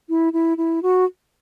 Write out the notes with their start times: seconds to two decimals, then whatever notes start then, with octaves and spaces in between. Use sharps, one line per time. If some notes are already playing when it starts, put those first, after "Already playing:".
0.09 E4
0.33 E4
0.58 E4
0.83 F#4